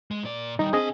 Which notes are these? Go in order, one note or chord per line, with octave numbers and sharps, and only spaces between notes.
G#3
A#2 D5
D#3 G3 D#4
C4 D4 G#4 D#5 G#5